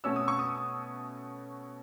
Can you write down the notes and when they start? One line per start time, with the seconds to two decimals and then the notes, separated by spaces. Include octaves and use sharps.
0.04 B2 A3 C#4 E6
0.16 D#6
0.28 C#6
0.39 D#6